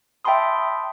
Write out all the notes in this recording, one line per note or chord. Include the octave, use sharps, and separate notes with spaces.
E5 G5 A5 B5 C6 D#6